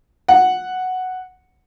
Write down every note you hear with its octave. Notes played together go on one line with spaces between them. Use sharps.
F#5